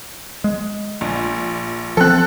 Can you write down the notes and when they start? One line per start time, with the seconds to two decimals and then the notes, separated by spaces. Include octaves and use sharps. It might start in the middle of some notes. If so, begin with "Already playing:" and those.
0.44 G#3
1.01 A#1
1.97 F3 C4 A4 F#6